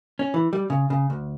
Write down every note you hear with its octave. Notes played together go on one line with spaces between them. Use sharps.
C#4
E3
G3
C#3
C#3
D2